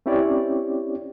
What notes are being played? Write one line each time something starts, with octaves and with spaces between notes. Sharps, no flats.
C4 C#4 E4 G4 C#5 D5